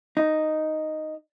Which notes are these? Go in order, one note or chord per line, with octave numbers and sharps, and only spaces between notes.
D#4